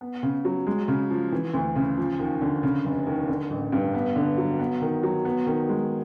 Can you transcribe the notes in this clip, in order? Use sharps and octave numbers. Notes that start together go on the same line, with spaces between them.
B3
C#3
F#3
G#3
C#3
F3
E3
D2
C#3
F3
D#2
D3
C#3
F1
D#2
D3
A1
G2
B3
D3
F#3
B3
D#3
F#3
B3
D#3
G#3